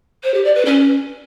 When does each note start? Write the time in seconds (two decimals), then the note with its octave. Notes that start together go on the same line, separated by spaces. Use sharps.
0.23 C5
0.34 G4
0.44 D5
0.55 B4
0.65 C#4